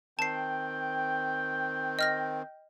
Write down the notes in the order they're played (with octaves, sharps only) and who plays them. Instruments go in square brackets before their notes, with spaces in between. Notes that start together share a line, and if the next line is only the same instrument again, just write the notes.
[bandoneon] D#3 C4 [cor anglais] G5 [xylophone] A5 C7
[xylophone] D#5 F6 A#6